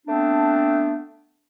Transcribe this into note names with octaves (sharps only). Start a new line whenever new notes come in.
A3 B3 C4 D4